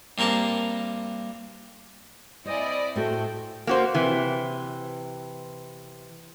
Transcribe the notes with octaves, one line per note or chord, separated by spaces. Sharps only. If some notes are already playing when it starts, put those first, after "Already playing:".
G2 A#3 C4 A#4 A5
C4 E4 C5 D5 D#5 G#5
A2 A3 F#4 A4 C5 G5
A#3 F#4 C5
C3 E3